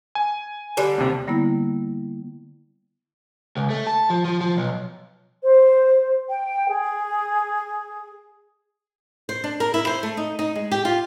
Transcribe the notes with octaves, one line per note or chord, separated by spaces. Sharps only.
G#5
D3 G3
D#2 C3
D3 G3 A#3 B3 E4
C#2
A3
A5
F3
F3
F3
B1
C5
G5
G#4
C5
D4
A#4
E4
C5
A3
D#4
D#4
G#3
G4
F4